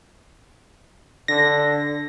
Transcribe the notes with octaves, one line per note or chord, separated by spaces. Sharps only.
D3 A#6